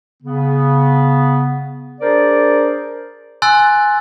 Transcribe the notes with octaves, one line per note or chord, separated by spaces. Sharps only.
C#3 B3
D4 G#4 A#4 C5 D5
G#5 C6 E6 F#6 A6